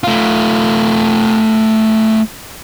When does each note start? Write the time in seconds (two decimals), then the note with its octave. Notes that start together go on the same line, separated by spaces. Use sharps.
0.04 A3 F4